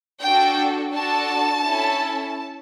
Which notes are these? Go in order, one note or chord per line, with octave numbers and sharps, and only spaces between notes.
D4 F#4 A4 G5
D4 F#4 A4 A5
C#4 E4 A4